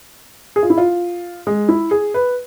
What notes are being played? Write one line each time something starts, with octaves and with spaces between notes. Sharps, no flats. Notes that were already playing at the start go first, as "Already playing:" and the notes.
G#4
F4
E4
F4
G#3
E4
G#4
B4